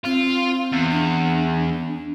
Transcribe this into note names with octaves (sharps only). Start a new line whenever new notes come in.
C4 F4
E2
D4